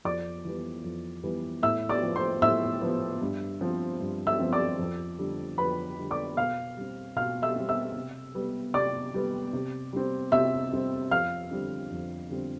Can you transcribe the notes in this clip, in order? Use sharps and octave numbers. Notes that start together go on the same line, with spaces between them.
F2 D5 D6
E3 G3 B3
F2
E3 G3 B3
A2 E5 E6
D5 D6
F3 B3
C5 C6
A2 E5 E6
F3 B3
G2
F3 C4
G2
E5 E6
F3 C4
D5 D6
F2
D3 G3
F2 B4 B5
D3 G3
D5 D6
B2 F5 F6
G3 C4
B2 F5 F6
E5 E6
G3 C4
E5 E6
C3
G3 B3
C3 D5 D6
G3 B3
C3
G3 C4
C3 E5 E6
G3 C4
F2 F5 F6
D3 G3 C4
F2
D3 G3 C4